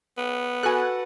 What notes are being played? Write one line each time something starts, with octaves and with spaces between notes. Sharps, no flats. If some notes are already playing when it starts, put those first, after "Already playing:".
B3
F#4 A4 B4 F#5 G#5 F#6